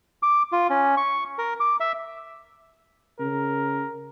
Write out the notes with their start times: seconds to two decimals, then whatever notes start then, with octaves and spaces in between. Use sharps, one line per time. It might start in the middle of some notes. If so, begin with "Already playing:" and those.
0.23 D6
0.52 F4
0.70 C#4
0.97 C#6
1.38 A#4
1.60 D6
1.80 E5
3.20 C#3 A#4